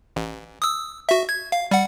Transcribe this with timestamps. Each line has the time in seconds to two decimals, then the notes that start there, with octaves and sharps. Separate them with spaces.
0.16 A1
0.62 D#6 E6
1.09 F#4 E5
1.29 G#6
1.52 F5
1.71 G3 F#5